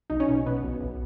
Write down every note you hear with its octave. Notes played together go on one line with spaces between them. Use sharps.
B1 D#4
C#4
B2
B2 B3
B1
B1